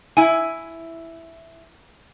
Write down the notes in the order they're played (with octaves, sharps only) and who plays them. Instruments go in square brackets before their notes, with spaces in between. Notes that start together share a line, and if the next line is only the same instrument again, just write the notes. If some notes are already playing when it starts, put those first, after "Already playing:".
[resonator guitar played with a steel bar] E4 G#5